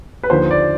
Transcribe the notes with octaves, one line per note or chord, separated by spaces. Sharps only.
B4
D#2 D3 F3 C5
D5